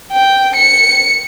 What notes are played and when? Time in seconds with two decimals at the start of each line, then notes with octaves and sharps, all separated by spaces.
0.12 G5
0.55 C#7